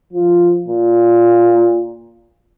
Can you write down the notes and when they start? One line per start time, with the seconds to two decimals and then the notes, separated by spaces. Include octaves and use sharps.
0.13 F3
0.68 A#2